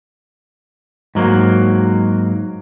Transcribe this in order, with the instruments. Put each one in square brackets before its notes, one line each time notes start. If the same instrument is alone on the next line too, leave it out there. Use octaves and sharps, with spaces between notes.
[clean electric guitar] G#2 F#3 A#3